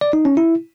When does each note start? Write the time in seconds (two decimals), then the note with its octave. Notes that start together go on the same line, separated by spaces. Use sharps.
0.01 D5
0.13 D#4
0.25 C#4
0.37 E4